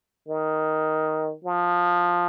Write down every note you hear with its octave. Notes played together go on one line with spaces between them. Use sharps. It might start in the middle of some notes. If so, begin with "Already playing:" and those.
D#3
F3